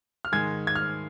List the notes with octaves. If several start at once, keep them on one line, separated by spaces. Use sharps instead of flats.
F6
G#2 D#3 G#3 G#6
G#6
F6